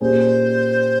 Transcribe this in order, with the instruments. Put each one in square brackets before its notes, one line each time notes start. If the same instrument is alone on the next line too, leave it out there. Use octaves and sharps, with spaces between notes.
[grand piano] A#2 G3 C#4 G#4 [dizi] C5